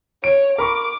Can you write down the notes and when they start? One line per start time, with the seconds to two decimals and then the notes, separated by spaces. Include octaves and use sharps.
0.24 C#5 D7
0.58 A#4 B5 C#6 D6